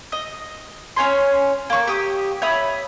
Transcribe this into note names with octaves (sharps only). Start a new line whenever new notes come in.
D#5
C#4 C#5 G#5 C6
A#3 C#6
G4 D#6
C#5 E5 B5 D#6